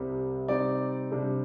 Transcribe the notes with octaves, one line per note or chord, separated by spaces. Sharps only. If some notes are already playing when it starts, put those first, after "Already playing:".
Already playing: C2 C3 G3
C3 G3 C4 D#4 D5
C3 G3 D4